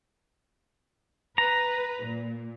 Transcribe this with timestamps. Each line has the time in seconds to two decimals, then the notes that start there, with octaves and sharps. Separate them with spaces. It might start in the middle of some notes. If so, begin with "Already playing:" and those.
1.38 B4 A#5
2.03 A#2